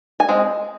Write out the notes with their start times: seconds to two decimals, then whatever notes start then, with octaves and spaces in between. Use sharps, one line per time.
0.20 G#5
0.29 G#3 C4